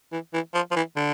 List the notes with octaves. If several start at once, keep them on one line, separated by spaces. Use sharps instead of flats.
E3
E3
F3
F3
E3
D3